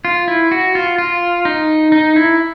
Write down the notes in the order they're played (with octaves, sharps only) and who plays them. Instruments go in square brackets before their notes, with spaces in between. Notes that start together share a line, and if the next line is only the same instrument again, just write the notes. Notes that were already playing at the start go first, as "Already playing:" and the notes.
[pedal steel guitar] F4
E4
F#4
F4
F4
D#4
D#4
E4